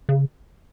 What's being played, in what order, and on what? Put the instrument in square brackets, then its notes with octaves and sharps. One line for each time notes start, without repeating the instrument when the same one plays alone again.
[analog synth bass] C#3